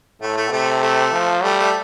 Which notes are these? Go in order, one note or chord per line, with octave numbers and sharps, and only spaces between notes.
A2 A3
A3
C3 A3
A3
F3
G3 A3
A3